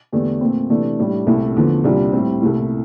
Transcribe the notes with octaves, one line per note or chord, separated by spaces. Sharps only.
E2 D3 A3 D4 G4
A#2 A3 C4
C3 E3 A3 D4
A2 G3 D4
C2 A#2 A3 E4 G4
E2 D3 F3 A3
C2 A#2 G3 D4 F4
A2 G3 C4
C2 A#2 A3 E4